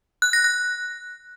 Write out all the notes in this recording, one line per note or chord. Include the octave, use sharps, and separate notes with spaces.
F#6
A#6
F#6